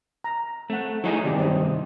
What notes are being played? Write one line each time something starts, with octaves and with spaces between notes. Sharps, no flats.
A#5
A3 C4 F#5
F#3 D#4 E4 G#4 D#5
G2 C3 D#3 G4 D5
C4 D#5